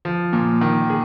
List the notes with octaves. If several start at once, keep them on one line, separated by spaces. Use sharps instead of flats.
F3
A#2
D#3
G#4